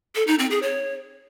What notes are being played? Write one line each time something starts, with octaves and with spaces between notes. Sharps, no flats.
A4
D#4
C4
G#4
C#5